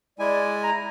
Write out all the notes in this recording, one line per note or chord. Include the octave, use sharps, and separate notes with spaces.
G#3 E4 D5 G#5
A#5